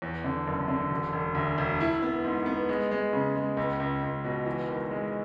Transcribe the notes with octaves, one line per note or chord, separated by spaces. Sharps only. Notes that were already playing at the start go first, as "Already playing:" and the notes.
E2
D3
F#1
D3
E1
E1
D2
E1
E4
B3
G#2
B3
G#3
G#3
C#3
G#3
C#2
C#2
C#2
B2
E3
G#1
G#3